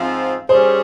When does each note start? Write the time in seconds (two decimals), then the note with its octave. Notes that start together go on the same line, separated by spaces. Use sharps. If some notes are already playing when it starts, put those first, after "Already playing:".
Already playing: G#2 F3 C4 F4
0.48 G3 C#4 G#4 C5